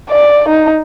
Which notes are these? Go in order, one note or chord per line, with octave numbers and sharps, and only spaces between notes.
D5
D#4